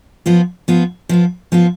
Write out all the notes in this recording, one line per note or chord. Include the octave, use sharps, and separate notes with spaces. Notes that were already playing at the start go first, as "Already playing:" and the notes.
F3 B3 F4
F3 B3 F4
F3 B3 F4
F3 B3 F4